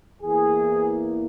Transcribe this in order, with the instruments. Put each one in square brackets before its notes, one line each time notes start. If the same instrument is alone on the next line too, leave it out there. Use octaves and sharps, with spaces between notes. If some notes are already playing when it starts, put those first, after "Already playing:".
[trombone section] E2 E3 A#3 G#4